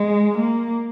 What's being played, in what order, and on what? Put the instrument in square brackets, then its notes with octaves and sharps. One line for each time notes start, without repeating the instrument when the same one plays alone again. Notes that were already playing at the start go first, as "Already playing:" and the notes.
Already playing: [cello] G#3
A#3